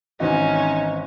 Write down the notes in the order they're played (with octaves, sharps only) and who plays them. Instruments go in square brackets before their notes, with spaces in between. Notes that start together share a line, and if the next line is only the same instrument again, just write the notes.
[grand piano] G#1 E3 F#4 [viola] C#4 [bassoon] D#4